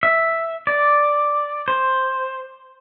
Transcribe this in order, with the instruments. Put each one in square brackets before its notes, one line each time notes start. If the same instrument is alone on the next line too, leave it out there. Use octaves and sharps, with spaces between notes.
[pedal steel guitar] E5
D5
C5